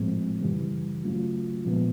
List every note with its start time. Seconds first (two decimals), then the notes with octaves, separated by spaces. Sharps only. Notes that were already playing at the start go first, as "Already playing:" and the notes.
Already playing: A2 F3 G#3 C4
0.41 F#2 C#3 E3 G3
1.04 C#3 F#3 A3 C#4 F4
1.65 A#2 F3 G#3 B3